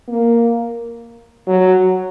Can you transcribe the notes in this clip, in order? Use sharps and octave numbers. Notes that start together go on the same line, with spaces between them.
A#3
F#3